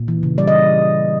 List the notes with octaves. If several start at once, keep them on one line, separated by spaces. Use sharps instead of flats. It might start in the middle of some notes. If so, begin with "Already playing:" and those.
Already playing: A#2
E3
C#3
G3 D5
D#5